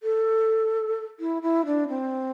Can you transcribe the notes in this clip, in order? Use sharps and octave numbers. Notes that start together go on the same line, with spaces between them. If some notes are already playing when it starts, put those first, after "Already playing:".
A4
E4
E4
D4
C4